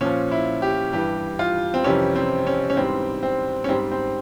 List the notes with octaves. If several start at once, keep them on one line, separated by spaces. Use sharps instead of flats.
A#2 F3 C#4
E4
G4
G2 E3 G3 G4
F4
C4
F2 C3 E3 G3 C#4
C4
C#4
C#4
G#2 E3 G3 C4
C4
C#4
G#2 G3 C4
C4